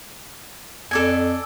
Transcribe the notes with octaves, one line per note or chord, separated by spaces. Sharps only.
F2 A4 D5 G#5